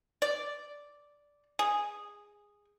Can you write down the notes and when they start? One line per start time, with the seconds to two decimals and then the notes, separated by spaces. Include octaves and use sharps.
0.22 D5
1.59 G#4